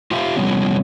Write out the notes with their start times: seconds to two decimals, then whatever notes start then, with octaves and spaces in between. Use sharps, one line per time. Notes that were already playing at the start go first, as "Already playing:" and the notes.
0.11 F4 G4 C5 E5 F5
0.36 C3 F3 G3 B3 C#4